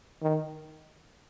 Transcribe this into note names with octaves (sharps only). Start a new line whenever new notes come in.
D#3